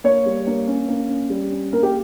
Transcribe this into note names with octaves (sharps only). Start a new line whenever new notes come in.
A#3 C#5
G3
A#3
C#4
A#3
C#4
G3
C#4
A#3 A#4
G4